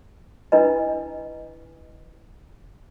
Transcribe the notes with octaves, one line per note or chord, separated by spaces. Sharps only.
D4 E4 B4 D#5